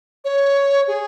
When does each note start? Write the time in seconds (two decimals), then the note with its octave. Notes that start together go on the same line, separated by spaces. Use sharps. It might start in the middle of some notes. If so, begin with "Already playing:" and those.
0.24 C#5
0.87 G#4